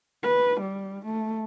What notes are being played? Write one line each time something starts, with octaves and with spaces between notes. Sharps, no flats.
B4
G3
A3